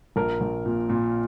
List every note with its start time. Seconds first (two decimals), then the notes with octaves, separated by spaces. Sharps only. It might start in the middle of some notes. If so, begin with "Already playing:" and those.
0.16 A#1 A#4
0.41 A#1
0.66 A#2
0.90 A#2